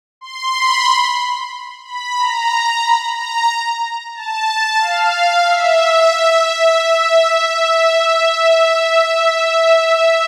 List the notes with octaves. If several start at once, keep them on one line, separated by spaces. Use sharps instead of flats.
C6
B5
B5
A#5
B5
A#5
A5
F5
E5